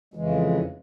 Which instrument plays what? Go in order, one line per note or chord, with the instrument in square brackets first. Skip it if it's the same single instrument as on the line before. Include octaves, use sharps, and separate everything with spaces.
[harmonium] F2 C#3 E3 G#3